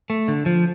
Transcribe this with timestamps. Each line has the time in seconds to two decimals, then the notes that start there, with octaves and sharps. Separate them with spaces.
0.10 A3
0.28 D3
0.46 F3